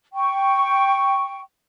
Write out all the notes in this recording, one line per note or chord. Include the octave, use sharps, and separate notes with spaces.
G5 C#6